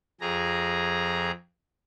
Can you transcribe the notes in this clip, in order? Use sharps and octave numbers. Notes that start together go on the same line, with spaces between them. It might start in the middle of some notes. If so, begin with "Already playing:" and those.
F2 G#4 A#5